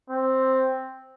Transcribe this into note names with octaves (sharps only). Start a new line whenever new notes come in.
C4